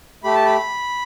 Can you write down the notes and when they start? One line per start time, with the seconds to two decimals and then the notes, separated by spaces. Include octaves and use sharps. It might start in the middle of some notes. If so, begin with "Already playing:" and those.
0.24 A3 G4 B5
0.35 A5
0.46 B5